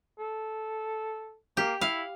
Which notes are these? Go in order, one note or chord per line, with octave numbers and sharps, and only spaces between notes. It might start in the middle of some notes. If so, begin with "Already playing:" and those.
A4
A#3 G4
E4 F5